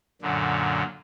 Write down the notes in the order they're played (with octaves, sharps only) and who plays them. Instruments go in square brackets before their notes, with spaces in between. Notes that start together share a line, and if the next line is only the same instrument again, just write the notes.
[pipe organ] F#2 A#2 D3